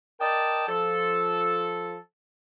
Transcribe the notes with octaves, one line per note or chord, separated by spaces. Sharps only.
A#4 D5 D#5 G5 A5
F3 A4